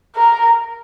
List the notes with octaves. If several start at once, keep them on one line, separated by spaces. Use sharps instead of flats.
A#4